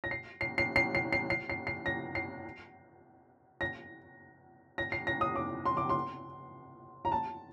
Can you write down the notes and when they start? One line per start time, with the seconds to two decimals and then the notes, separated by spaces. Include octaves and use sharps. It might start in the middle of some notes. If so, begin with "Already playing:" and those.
0.04 A#6
0.11 C7
0.41 C7
0.58 C7
0.76 C7
0.95 C7
1.13 C7
1.30 C7
1.50 C7
1.67 C7
1.86 A#6
2.15 C7
3.61 A#6
4.78 A#6
4.92 C7
5.07 A#6
5.21 D#6
5.36 D6
5.66 C6
5.77 D6
5.89 C6
7.05 A#5
7.12 A5